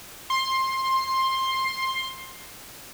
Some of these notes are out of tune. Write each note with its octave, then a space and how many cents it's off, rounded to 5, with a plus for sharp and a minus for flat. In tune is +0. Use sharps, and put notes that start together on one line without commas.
C6 +15